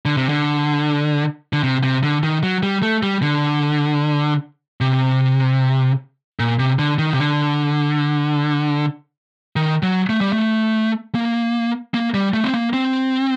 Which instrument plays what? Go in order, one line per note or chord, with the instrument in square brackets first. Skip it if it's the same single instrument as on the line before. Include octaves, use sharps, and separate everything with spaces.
[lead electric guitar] D3
C3
D3
D3
C3
C3
D3
D#3
F#3
G3
A3
G3
D3
C3
A#2
C3
D3
D#3
C3
D3
D#3
F#3
A3
G3
A3
A#3
A#3
G3
A3
C4
A#3
C4